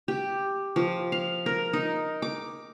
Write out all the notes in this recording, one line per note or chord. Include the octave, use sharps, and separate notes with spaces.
G4
F3
F5
A#4
D#4
D6